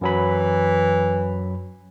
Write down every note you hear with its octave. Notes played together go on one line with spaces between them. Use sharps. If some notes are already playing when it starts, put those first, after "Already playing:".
F#2 E3 F#3 B5